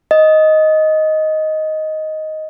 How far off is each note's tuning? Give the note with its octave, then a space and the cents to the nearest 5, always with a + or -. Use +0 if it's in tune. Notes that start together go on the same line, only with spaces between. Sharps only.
D#5 +5